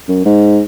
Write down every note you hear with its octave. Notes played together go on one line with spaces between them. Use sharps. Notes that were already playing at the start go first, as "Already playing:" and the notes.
F#2
G#2